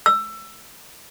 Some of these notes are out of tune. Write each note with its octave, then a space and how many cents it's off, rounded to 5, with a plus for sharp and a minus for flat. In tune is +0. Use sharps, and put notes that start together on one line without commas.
E6 +20